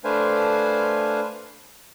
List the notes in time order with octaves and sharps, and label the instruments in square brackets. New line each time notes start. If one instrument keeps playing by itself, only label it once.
[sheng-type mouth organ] A3 D4 B4 C5 F5 G#5